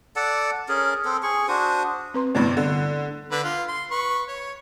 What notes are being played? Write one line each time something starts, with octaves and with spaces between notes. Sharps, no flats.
A4 D5 F#5 A5
C#4 G#4 A#4
C4 A4
G#4 C#6
D4 F#4 C5 D#6
C4 B4 C6
G2 C3 A3 B3 D4 E4
D3
D3 B4
F4
C6
B4 C#6
C#5